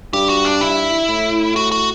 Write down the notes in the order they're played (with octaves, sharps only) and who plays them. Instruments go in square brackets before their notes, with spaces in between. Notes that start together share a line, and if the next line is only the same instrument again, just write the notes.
[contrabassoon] G2 [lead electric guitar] G4
[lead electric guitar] F#4
D4
E4
[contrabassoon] A2
[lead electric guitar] F#4
F#4